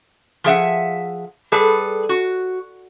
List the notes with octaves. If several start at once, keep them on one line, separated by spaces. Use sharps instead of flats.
F3 G#4 E5 F#5
G3 G#4 A4 B4
F#4